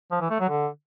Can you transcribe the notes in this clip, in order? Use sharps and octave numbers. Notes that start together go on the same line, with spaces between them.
F3
E3
A3
F#3
D3